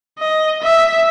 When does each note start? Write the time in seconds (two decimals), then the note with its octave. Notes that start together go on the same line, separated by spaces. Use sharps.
0.19 D#5
0.63 E5